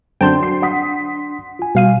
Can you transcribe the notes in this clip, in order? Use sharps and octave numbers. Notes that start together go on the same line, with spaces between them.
F#2 D3 C4 D4 G5 A5 C6 G6
F#3 C7
F#5 D#6 B6
F4 G#5
B2 G3 F5 D#7